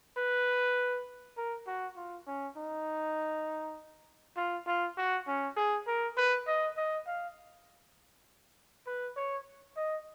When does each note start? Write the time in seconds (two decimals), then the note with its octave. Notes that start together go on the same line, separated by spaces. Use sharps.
0.17 B4
1.37 A#4
1.67 F#4
1.97 F4
2.27 C#4
2.57 D#4
4.37 F4
4.67 F4
4.97 F#4
5.27 C#4
5.57 G#4
5.87 A#4
6.17 B4
6.47 D#5
6.77 D#5
7.07 F5
8.87 B4
9.17 C#5
9.77 D#5